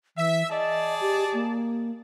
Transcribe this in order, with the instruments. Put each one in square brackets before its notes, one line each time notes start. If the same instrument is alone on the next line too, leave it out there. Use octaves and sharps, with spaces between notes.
[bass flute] E3 [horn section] E5
[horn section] G#4 D5 A5 [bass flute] D#5
[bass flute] G4
A#3